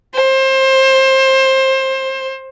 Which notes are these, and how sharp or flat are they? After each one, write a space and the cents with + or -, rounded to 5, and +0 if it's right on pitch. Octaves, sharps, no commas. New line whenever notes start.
C5 +25